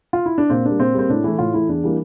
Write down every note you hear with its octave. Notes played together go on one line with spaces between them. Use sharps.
F4
E4
D4
A#2 C4
G3 A#3 D4
A#2 C4
G3 A#3 C4
A2 D4
E3 A3 E4
A2 F4
E3 A3 E4
E2 D4
E3 G3 A#3